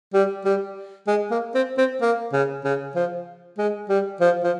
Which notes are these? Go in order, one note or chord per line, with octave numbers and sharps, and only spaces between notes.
G3
G3
G#3
A#3
C4
C4
A#3
C#3
C#3
F3
G#3
G3
F3
F3